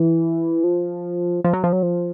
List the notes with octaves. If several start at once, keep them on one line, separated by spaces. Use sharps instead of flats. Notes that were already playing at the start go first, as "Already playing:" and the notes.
Already playing: E3
F3
F3
F#3
F3
F#3
F3